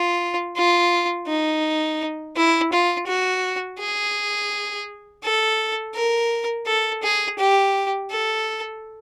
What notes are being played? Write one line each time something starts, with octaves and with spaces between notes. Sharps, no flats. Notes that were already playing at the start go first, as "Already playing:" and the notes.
Already playing: F4
F4
D#4
E4
F4
F#4
G#4
A4
A#4
A4
G#4
G4
A4